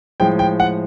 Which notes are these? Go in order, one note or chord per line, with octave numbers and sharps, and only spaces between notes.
A2 F3 G#3 G5
G5
F#5